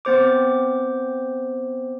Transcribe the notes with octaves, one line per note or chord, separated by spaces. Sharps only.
B3 C4 C5 D6